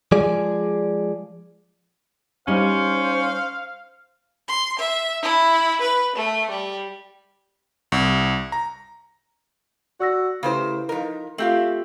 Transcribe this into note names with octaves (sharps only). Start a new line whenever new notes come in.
F3 G#3 G#4 D5
G3 C#4 D#4 C5 F5
C6
E5
E4
B4
A3
G3
C2
A#5
F#4 D5 E6 A#6
C#3 A3 E4 G4 B4 C5 F5
F3 D#4 A#4
A3 C4 F4 G4 F5 G6 F#7